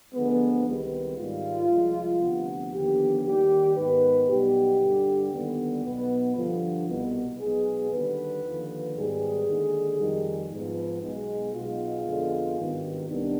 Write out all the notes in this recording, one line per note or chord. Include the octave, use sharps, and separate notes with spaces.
D2 D3 F3 G#3 B3
C2 C3 D#3 G#3 B3
G#2 D#3 G3 F4
C2 C3 F3 G#3
D2 C3 F3 B3
D#2 D3 F3 B3 G4
D#2 D#3 G3 G4
G#2 D#3 B3 B4
B1 B2 G3 B3 G4
G2 D3 G3
D#2 D3 G3 B3
B1 B2 B3
G2 D3 F3
C2 B2 B3
B1 B2 G#3 B3 G#4
D#2 D3 G3 B4
D#2 D3 F3
G#2 D#3 G3 B3 G#4
D#2 D3 G#3
F2 D#3 G3
G#2 F3 B3
B1 B2 G#3
B1 B2 G#3 B3 F4
F2 D3 G#3 B3
G#1 G2 D#3 B3
C2 C3 D#3 B3 D4